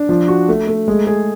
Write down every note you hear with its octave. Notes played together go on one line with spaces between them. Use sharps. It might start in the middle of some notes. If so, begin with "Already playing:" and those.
Already playing: D4
F3
F#4
A3
A3
G#3
G#4